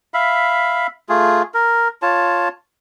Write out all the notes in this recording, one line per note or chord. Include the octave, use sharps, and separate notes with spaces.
E5 F5 B5
A3 F4 G#4
A#4
F4 C#5 A5